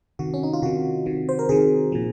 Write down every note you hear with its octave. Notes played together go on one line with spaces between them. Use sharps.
C3 D#3 F#4
C#4
D#4
F4
C3 D#3 F#4
C3 D#3
C5
A#4
C3 D#3 G#4
A#2 F3